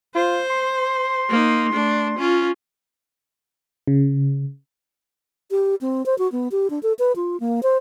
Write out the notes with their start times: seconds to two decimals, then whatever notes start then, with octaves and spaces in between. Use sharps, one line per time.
0.15 F4 C5
0.50 C6
1.29 A#3 D#4
1.73 A3 D4
2.18 C#4 F4
3.87 C#3
5.51 G4
5.81 C4
6.06 C5
6.18 F#4
6.32 B3
6.52 G4
6.70 D4
6.83 A4
6.99 B4
7.16 F4
7.40 A#3
7.63 C5